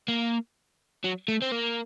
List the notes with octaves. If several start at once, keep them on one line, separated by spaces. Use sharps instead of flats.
A#3
F#3
A3
C4
A#3